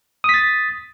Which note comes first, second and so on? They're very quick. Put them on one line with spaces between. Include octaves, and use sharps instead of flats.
D#6 B6 A6